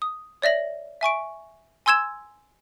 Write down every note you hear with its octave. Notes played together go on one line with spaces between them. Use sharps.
D#6
C#5 D5 E5 A#6 F#7
E5 G#5 C#6 D7
G#5 C6 E6 G#6 E7